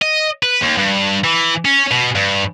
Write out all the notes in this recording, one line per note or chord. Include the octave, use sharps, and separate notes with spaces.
D#5
B4
D#2
G2
E3
C#4
B2
G2